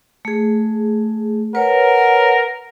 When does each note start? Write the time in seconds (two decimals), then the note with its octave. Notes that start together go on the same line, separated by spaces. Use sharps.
0.25 A3 G#4
1.55 A#4 B4 C#5 F#5